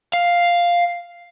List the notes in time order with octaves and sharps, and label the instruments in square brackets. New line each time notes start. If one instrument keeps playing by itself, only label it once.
[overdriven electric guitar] F5